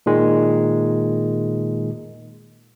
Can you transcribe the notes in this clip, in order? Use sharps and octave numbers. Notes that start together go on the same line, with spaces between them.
A#2 D#3 G#3